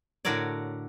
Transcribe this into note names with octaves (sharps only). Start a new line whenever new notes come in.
A2 D3 F#4 A#4 C#5 D5